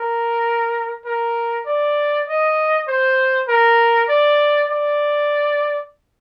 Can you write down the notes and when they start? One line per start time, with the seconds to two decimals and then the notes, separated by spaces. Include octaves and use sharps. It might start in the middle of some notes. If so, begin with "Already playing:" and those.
Already playing: A#4
1.05 A#4
1.66 D5
2.27 D#5
2.88 C5
3.48 A#4
4.09 D5
4.70 D5